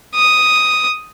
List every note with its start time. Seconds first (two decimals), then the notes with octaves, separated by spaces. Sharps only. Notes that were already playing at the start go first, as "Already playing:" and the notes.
0.15 D#6